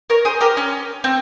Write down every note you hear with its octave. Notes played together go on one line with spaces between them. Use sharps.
A#4 C#5
G#4 C5
G4 A#4
C#4
C4